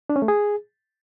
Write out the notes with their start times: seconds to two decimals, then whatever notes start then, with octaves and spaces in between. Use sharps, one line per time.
0.10 D4
0.16 C#4
0.22 A3
0.28 G#4